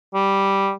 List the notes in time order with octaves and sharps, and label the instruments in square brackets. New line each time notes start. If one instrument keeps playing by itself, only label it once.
[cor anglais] G3